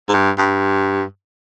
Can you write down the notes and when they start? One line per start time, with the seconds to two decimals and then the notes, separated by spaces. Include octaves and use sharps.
0.09 G#2
0.14 G2
0.38 G2